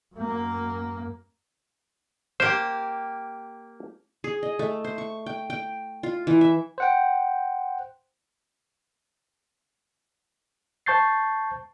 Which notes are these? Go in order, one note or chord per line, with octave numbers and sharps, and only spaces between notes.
F#2 A#3
A#3 G4 C5
G#4
D#5
A3
C5
C#6
G5
G5
F4
E3
E5
C5 F#5 G5
C5 A5 C#6 G6 A6 C7